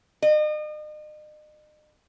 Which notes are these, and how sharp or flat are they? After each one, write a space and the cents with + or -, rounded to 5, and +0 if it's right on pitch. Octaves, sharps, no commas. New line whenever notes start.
D#5 -40